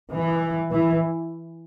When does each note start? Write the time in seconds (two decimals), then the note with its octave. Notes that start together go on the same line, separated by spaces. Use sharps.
0.12 E3
0.72 E3